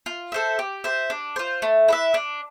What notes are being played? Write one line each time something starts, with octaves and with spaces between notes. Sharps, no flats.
F4
A4 C5 E5
G4
C5 E5
D4
F4 C5
A3
E4 B4 E5
D4